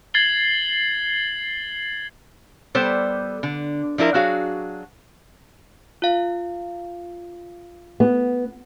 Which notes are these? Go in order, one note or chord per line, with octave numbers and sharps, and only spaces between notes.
G#6 A6 C7 F#7 G7
G3 B3 A4 C5 D5
D3
F3 D4 E4 A#4
F#3 D4 F#4 G#4 F5
F4 F5
B3